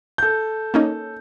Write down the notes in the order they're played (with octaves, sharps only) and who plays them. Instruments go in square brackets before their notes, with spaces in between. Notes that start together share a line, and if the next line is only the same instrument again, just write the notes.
[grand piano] A4 G6
[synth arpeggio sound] A#3 C#4 D#4